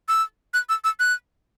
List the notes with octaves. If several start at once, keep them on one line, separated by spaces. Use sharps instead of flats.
E6
F#6
E6
E6
F#6